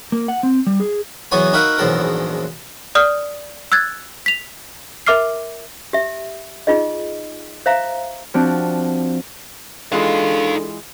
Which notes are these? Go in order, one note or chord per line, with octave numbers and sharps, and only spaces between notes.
A#3
F#5
C4
G3
G#4
E2 E3 F#3 B3 C#5 G#5
D#4 F#4 A#4 B4 E5 F5
A#1 E2 G#2 F#3 A4 A#4
D5 D#6 F6
E6 F#6 G#6 A6
B6 F7
A#4 E5 D6 F6 C7
G4 E5
D#4 F4 G#4 D#5
C5 E5 F5 A#5
F3 C4 D4 F#4
E3 G#3 D4 D#4 F4 A4 F5